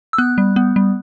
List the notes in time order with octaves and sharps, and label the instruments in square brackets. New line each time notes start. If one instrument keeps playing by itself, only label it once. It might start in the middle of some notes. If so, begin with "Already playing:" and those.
[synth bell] E6
B3 F#6
G3
B3
G3